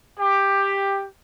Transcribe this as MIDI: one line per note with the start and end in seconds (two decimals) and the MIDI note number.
0.19 1.05 67